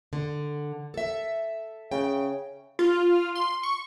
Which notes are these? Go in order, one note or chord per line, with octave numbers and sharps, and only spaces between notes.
D3
A4 E5
C#3 G5
F4
C6
C#6